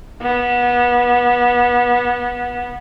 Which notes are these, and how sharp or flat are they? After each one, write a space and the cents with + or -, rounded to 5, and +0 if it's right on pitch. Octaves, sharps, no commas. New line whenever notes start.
B3 -25